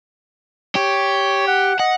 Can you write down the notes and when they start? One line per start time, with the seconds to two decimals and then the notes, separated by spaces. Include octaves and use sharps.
0.76 G4 C#5
1.48 F#5
1.80 D#5 F#5